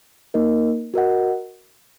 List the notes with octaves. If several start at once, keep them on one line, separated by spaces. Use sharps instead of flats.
A#3 D#4 A#4 D#5
F#4 A#4 D#5 F#5